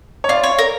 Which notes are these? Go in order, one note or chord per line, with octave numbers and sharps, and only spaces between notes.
C#5
F4 D5
C#5
A#4